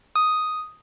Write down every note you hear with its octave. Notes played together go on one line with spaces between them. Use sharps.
D#6